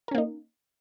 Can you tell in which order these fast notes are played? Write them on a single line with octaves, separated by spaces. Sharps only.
A#4 C#4 A#3 D#4